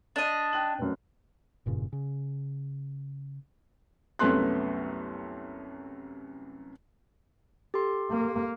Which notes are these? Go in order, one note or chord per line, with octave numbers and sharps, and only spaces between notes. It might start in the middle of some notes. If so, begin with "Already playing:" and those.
D4 D#5
G5 F#6 F#7
F1 F#2
F1 G2 A#2 C#3
C#3
C2 F#2 A3 B3 C6 F#6
G4 A4 C6
A#3